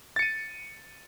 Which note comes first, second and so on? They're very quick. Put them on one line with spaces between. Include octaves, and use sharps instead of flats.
A6 C#7 D#7